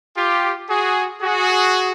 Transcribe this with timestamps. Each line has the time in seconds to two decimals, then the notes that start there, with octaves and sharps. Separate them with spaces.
0.16 F4 G4
0.69 F#4 G#4
1.21 F#4 G#4